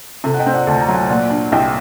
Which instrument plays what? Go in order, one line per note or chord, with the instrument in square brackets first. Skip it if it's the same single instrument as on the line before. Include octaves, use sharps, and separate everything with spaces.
[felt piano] C3 [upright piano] A4
[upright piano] F#5
D#5 G5
[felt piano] C4
[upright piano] D5 F#5
[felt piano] D2 [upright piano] A5
[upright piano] A#5
[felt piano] F#3
[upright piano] F#5 A5
[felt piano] A#2 [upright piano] D5 F#5
[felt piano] D4
[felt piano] C2 [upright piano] D#5 G5